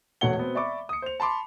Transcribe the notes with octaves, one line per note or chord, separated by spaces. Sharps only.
E1 B2 A3 C#5 F#5 G7
B2 B3 C4
D5 E5 B5 C#6 D6
D#6 C#7
C5 F7
A5 B5 C6 D6